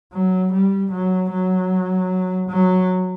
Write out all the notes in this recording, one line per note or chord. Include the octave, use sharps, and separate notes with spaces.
F#3
G3
F#3
F#3
F#3